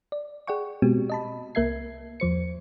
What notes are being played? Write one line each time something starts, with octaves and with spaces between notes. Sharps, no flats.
D5
G#4 D5 F#5 G5 C#6
B2 G#3 B3 C4 F#4 G4
D#5 A5 B5
C2 A#3 A#4 E5 G#6 C7
E2 F3 C5 C#7